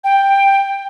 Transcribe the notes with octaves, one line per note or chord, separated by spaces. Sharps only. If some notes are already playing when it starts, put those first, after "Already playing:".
G5